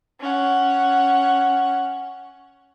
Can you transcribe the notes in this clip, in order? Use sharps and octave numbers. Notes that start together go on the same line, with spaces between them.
C#4 F#5